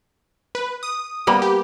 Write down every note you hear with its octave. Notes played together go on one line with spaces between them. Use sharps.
B4
D#6
G3 A#3 B3
G4